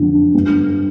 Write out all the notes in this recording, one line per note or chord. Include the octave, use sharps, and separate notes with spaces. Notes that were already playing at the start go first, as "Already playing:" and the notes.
Already playing: F2 D3 F#3
G2